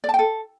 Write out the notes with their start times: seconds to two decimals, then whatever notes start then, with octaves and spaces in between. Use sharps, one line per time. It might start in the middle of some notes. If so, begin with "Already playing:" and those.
0.04 D5
0.09 A5
0.14 G5
0.19 A4